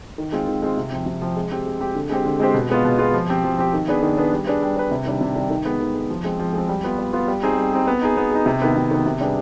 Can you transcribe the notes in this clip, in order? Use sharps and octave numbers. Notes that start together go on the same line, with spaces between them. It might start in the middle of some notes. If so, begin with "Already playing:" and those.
D#3
G#3 C4 F4
D#3
G#3 C4 F4
C3
F3 C4
C3
F3 C4
G#3
C4 G4
G#3
C4 G4
D3
G#3 C4 G4 C5
D3
G#3 C4 G4 C5
B2
G#3 B3 F4
B2
G#3 B3 F4
F3
C4 G4
F3
C4 G4
D#3
B3 D4 G#4 B4
D#3
B3 D4 G#4 B4
G3
D4 G#4 B4
G3
D4 G#4 B4
C3
D#3 G3 D4
C3
D#3 G3 D4
D#3
G#3 B3
D#3
G#3 B3
F3
G#3 C4
F3
G#3 C4
G3
B3 F4
G3
B3 F4
G3
C4 D#4 G#4
G3
C4 D#4 G#4
B3
D#4 G#4
B3
D#4 G#4
C3
D#3 B3
C3
D#3 B3
C3
G3 D4 G#4 B4